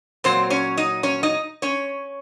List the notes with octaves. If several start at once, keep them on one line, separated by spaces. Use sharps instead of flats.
A#2 F#3 C4 C5
C#4 C#5
D#4 D#5
C#4 C#5
D#4 D#5
C#4 C#5